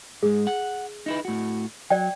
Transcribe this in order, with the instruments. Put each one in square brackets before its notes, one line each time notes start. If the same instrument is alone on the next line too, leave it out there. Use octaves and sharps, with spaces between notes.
[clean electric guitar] G#2 G#3 [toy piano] G#4
[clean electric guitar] F#5
D#4 E4 B4
A2 F#4
[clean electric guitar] F#3 [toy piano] D5 G5